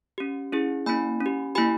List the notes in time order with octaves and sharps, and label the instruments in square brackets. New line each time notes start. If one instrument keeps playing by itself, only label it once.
[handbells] C#4 G4
C#4 E4 G#4
A#3 C#4 E4 G#5 B5
C#4
G4
A#3 E4 G4 G#5 B5